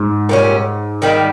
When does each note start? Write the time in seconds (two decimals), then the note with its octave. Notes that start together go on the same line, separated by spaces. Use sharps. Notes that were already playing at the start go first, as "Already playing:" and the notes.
Already playing: G#2
0.29 A#2 G3 C#4
1.02 D#3 G3 A#3